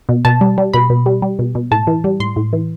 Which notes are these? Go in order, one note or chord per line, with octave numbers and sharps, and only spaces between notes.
B2
B2 A5
G3
G3
B2 B5
B2
G3
G3
B2
B2
A2 A5
E3
G3
A2 C6
A2
E3